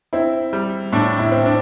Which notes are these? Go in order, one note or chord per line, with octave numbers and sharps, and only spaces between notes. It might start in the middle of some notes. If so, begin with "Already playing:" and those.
C4 E4
G3
A2 D4
E4
C4
D4